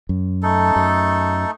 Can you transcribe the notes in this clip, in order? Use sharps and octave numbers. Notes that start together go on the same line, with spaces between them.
F#2
A3 D#4 A4
F#2